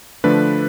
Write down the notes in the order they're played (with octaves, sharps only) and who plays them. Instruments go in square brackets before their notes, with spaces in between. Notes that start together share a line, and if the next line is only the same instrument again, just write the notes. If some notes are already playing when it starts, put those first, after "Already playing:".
[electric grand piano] D3 F3 A3 D4 B4